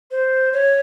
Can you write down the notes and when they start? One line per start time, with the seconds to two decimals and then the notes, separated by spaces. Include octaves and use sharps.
0.11 C5
0.53 C#5